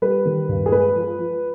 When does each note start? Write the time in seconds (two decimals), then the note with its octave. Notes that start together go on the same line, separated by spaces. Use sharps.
0.02 G3 B4
0.25 D#3
0.49 G2
0.66 G#4
0.72 G#3 B4
0.96 F3
1.19 F3